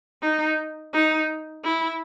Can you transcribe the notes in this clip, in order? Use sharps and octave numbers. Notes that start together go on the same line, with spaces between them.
D#4
D#4
E4